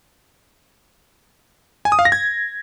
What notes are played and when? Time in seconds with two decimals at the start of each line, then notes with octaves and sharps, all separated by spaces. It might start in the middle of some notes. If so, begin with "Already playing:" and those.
1.85 G#5
1.92 D#6
1.99 F5
2.05 A#6
2.12 G#6